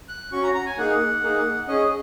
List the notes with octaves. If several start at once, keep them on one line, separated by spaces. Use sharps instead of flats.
F#6
C#4 F#4 C#6
A#5
A#5
G#5
A#3 D#4 G#4 F#5
A#3 D#4 G#4
C#4 G#4 D#5